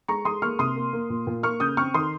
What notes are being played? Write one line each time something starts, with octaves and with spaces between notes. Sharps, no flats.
G#3 A#5 C#6
G#3 C6 D#6
A#3 C#6 F6
C3 C6 D#6
A#3
A#3
A#2
A#2
A#3 C#6 F6
C#3 D#6 G6
C4 C#6 F6
D#3 C6 D#6